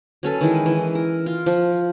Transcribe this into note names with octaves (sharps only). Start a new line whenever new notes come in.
F#3 C#4 A4 B4
D#3 E3 G#3
E3
A#4
F4
F3